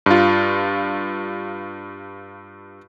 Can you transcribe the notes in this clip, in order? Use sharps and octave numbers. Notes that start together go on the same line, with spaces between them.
G2 F4